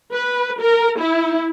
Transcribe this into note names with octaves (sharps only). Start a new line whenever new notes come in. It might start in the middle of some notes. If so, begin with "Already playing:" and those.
B4
A#4
E4